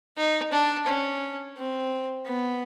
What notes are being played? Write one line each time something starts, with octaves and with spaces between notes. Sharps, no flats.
D#4
D4
C#4
C4
B3